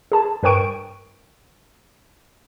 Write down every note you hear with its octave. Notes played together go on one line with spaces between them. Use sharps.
G#4 A5
G2 A#4 B4 G5 C#6 D7